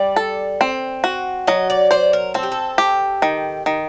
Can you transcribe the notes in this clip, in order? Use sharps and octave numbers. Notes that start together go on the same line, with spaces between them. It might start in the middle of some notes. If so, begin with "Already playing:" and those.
Already playing: G3 D5
A4
C4
F#4
F#3 D#5
D5
C5 D5
A#4
C4 A4
G4
A4
G4
D#3
D#3